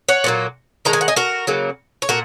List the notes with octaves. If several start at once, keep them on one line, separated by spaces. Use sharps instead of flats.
C#5 F#5
A#2 F#3 A#3
D#3 G#3 A#5
G#5
F#5
D#5 G#5
F#4 A#4
C#3 F#3 A#3
C#5
A#2 F#4 A#4